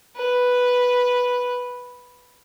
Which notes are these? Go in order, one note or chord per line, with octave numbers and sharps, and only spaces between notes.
B4